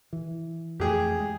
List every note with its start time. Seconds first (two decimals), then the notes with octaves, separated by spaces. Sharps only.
0.13 E3
0.80 F2 A3 G4 G#4
1.20 G#3